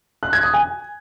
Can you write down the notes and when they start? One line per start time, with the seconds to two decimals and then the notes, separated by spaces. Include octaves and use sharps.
0.23 F#6
0.33 G#6
0.43 D#6
0.54 G#5